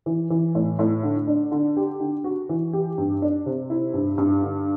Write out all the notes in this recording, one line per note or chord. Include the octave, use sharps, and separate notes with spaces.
E3
E3
A2
A2
D3
D4
D3
G4
D3
F#4
E3
G4
G2
D4
C3
E4
G2
G2
D3